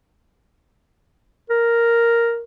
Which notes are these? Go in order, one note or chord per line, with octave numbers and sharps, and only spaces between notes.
A#4